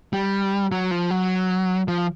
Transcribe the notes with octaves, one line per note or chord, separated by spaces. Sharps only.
G3
F#3
F3
F#3
F3